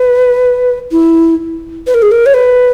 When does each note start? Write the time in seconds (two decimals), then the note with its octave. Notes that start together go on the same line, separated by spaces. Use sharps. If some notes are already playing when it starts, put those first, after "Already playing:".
Already playing: B4
0.92 E4
1.87 B4
1.94 A#4
2.02 G#4
2.11 A#4
2.26 C#5
2.34 B4